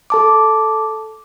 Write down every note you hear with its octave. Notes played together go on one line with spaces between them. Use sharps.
A4 A5 D6